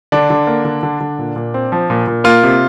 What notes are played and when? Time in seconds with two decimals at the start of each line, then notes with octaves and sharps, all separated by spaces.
0.12 D3 D4
0.30 D3
0.47 A#3
0.65 D3
0.83 D3
1.00 D3
1.19 A#2
1.36 A#2
1.54 C4
1.72 F3
1.90 A#2
2.07 A#2
2.24 A#3 F4
2.43 C3